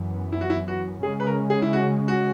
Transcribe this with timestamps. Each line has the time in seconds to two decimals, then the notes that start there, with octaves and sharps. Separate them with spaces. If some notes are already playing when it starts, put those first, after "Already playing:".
Already playing: F#2 E3 B3
0.32 E4
0.41 F#4
0.50 E4
0.68 F#4
1.03 C#3 G#3 C#4 G#4
1.20 B4
1.26 A#4
1.50 G#4
1.62 E4
1.73 F#4
2.08 F#4